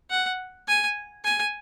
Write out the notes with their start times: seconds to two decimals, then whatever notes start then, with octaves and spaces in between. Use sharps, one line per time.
0.10 F#5
0.68 G#5
1.25 G#5